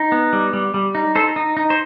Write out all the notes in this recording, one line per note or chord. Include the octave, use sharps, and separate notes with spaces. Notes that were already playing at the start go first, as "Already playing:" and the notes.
Already playing: D#4
B3
G3
G3
G3
D#4
D#4 A4 C5
D#4
D#4
C5